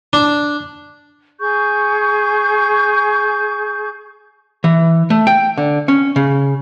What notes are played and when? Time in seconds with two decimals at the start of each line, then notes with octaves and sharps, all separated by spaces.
0.13 D4
1.40 G#4 C#6 G6
4.64 E3
5.10 A3
5.27 G5
5.58 D3
5.88 C#4
6.16 C#3